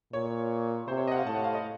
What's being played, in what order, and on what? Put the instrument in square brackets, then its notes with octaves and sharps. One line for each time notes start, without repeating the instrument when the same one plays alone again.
[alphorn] A#2 [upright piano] C#5
[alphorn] C3 [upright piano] C5
[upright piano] C#5
D#5
F#5
F5
[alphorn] A2 [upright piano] A5
[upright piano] F#5
F5
D#5